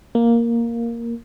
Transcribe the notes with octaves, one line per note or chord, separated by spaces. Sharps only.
A#3